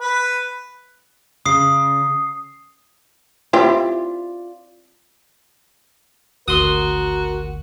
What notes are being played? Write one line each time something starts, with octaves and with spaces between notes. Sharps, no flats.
B4
C#3 D#6 C7
C4 E4 F4 G4 D5
G#1 D2 F#4 A#4 C6 D#6